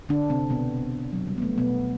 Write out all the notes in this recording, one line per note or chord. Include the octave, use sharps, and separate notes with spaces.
D3 D4
C3 C4
B2 B3
F#3
G3
B3
A3
B2 B3